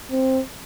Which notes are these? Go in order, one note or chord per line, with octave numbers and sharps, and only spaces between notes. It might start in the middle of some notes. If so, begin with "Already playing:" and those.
C4